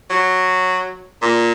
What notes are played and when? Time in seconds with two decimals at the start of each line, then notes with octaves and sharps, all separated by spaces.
0.10 F#3
1.22 A#2